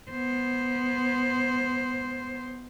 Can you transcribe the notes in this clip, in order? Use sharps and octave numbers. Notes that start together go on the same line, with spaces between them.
B3 C5